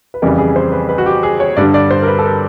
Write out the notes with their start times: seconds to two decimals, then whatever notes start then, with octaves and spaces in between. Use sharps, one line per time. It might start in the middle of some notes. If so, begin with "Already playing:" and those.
0.14 B4
0.22 F2 C#3 E3 G3 A#4
0.38 G#4
0.56 C5
0.72 B4
0.89 B4
0.98 F#4
1.06 G4
1.23 G#4
1.40 C#5
1.57 G2 D3 G3 D5
1.74 D5
1.91 C5
2.02 A#4
2.08 B4
2.19 A4
2.25 A#4